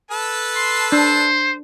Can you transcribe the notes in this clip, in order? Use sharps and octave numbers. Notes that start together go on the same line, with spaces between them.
A4 B4 A5
C6
D4 C5